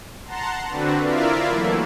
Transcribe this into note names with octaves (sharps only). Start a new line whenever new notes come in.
F#5 A5 A#5 C6
D3 C4 D4 F#4 B4
E4 F4 A#4 D5 E5 F5
E3 F#3 A3 A#3 E4